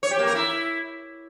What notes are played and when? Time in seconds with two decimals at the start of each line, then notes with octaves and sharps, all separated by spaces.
0.03 C#5
0.11 G4
0.19 A#3
0.27 A#4
0.35 E4